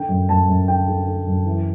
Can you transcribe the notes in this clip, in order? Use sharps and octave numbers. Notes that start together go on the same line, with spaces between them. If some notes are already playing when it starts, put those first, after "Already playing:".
Already playing: D3 G5
F#2
F#2 A5
F#2
D3 G5
D3
D3
F#2
E3